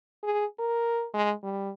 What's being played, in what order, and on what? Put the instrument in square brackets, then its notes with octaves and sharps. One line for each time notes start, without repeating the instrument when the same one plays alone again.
[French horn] G#4
A#4
G#3
G3